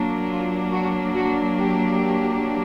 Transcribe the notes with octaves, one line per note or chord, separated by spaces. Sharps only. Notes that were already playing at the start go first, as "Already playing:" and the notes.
Already playing: F#3 A#3 D4
F4
F#4
F#4
G4